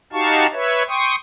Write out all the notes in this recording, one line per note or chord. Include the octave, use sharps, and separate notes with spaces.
D#4 F#4 G4 F5 A5 C#6
B4 C#5 E5
G5 C6 C#6 D#6